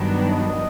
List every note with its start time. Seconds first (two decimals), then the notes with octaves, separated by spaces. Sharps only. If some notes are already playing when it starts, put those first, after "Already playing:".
Already playing: G2 D#3 F#3 B3 D4
0.29 D#5